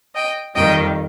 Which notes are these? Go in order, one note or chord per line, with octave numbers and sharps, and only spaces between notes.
D#5 G5
F2 D#3 G3 D#5 G5